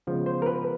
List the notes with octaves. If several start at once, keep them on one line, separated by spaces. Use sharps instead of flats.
C#3 F3 G#3 B3
C5
A#4
B4